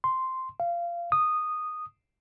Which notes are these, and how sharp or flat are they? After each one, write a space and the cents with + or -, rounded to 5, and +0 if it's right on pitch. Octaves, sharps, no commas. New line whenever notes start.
C6 -5
F5 -20
D#6 -10